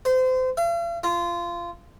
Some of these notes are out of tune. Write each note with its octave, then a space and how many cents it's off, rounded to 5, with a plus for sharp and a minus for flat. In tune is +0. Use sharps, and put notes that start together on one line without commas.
C5 -30
F5 -45
F4 -20